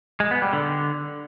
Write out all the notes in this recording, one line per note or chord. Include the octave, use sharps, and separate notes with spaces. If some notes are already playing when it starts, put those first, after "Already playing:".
G#3
B3
G3
D3